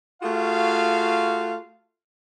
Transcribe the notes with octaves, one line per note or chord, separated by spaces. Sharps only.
A3 F4 F#4 G#4 F5